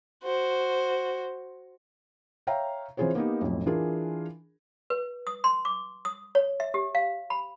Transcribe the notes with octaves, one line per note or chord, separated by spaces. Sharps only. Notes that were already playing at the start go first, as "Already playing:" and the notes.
F#4 C5
C#5 E5 F5 G5 A#5
E3 C4 F4 G#4 C5 C#5
A#3 B3 D#4 G4
B1 F2 A2
E3 D4 F4 G#4 A#4
B4
D#6
C6
D6
D#6
C#5
E5
G4
F5
B5